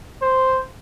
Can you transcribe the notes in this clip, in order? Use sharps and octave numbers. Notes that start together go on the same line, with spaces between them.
C5